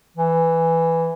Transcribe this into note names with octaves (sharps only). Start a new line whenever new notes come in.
E3